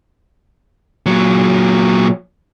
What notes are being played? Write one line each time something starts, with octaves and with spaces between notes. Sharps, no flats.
A#2 F#3